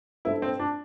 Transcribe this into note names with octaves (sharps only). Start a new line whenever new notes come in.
G3 D4 E4 A4 C5
C4
D4